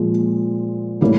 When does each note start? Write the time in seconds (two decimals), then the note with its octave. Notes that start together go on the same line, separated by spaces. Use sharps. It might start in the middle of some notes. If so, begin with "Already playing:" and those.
Already playing: A#2 F3 G#3
1.01 A2 E3 G3 A#3 C#4